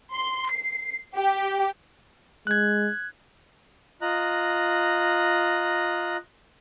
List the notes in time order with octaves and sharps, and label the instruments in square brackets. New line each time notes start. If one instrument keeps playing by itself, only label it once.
[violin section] C6
C7
G4
[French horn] G#3 [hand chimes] F#6 G#6
[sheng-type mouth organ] F4 D#5 A#5 F#6